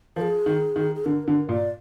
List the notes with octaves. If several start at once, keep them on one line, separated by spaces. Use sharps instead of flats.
F3 A#4
G#4
D#3
D#3
G#4
D3 A#4
D3 A#4
A#2 D5